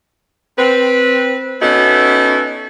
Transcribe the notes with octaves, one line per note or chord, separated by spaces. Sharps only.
C4 B4
B3 C#4 D#4 E4 F#4 A4